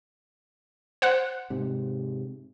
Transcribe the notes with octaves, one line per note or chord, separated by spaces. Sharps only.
C5 F#5 F#6
G#2 C3